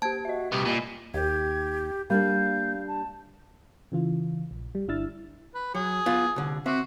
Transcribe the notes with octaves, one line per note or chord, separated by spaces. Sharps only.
A#3 G4 C5 A5 G#6
F#4 D#5 E5
C2 B3 G4
A#2 D#5 G#5 B5
D#2 G4 G#6
G3 A#3 D4 F5 G6
A5
C#3 E3 F4
A#1
G3
G1 D4 E4 E6 F6 A6
B4
F#3 G#4
B3 F4
C2 D3
C4 F#4 E5